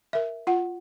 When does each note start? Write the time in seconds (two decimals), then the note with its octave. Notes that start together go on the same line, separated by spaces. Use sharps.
0.13 A#4 E5
0.47 F4 F#5